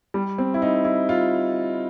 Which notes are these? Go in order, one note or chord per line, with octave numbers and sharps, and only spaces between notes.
G3
C4
E4
D#4
E4
F4